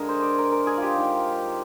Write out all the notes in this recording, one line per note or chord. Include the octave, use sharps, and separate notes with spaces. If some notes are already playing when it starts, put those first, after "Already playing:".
Already playing: D3 G#3 G#4 A#4
C5
D5
A#4
A#4
G#4
F4 G4
D#3 G#3